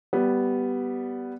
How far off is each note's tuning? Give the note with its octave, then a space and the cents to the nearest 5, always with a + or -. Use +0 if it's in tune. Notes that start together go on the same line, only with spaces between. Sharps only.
G3 -10 B3 +0